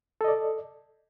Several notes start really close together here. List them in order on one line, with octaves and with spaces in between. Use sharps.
A4 D#5 D5